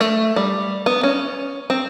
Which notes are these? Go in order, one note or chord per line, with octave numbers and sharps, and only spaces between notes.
A3
G3
B3
C#4
C4